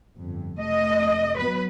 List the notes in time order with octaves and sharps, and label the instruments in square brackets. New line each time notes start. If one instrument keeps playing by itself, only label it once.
[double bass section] G1 F2
[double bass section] F1 A3 [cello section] D#5
[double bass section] F#3 B3 [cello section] B4